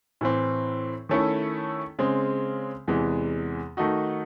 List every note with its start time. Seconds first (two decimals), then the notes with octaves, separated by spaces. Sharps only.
0.21 A2 E3 C4
1.09 D#3 A3 C#4 E4 A4
1.99 C#3 G#3 C4
2.88 E2 C3 E3 G#3
3.77 D#3 A3 D#4 F#4